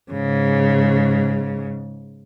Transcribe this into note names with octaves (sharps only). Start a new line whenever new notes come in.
G#2 C#3